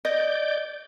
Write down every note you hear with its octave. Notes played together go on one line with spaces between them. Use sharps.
D5 D#5 G6